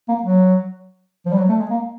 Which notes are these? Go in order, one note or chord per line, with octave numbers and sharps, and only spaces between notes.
A#3
F#3
F3
G3
F#3
A3
G#3
A#3